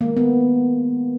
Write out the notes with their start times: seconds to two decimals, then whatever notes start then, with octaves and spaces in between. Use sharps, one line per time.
0.01 D#3 A#3
0.04 G#3
0.17 B3